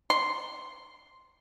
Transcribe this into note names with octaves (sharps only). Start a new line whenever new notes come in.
C6